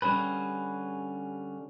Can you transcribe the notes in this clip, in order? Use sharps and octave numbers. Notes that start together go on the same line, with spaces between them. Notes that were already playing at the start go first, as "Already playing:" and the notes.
D3 G3 C#4 G#4 B4